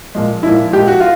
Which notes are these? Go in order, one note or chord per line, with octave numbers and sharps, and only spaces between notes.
A#2 F3 G#3
A#2 F3 G#3 E4
A#2 F3 G#3 G4
F#4
F4